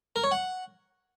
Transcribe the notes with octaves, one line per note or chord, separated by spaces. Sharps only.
A#4
C#5
F#5